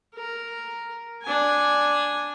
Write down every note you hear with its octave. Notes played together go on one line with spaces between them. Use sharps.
A#4
D4 G#5